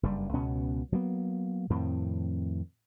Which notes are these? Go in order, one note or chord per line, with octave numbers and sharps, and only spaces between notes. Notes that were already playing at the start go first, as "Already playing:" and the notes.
F#1 G2 G3
C#2 B2 B3 C#4
F#3 G3 A#3 B3
F2 A2 D#3 C4